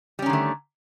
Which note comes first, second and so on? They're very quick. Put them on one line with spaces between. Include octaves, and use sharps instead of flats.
G3 C#4 D#3 D3 A3